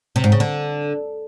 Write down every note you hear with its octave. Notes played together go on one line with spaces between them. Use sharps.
C3
G#2
C#3
D3